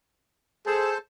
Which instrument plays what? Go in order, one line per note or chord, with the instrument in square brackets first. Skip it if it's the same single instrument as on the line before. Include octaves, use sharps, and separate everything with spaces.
[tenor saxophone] G#4 [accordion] A4 C5 A5